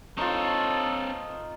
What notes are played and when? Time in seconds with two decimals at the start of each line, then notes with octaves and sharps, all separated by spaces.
0.18 C4 D#4 F4 A4 C#5